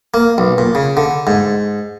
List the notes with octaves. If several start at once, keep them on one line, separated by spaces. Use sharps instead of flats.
A#3
B1
A#2
C#3
D3
G#2